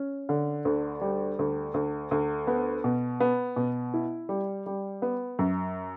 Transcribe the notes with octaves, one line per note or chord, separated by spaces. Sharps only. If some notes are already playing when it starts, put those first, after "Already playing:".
Already playing: C#4
D3
D2
G3
D2
D2
D2
B3
B2
B3
B2
E4
G3
G3
B3
F#2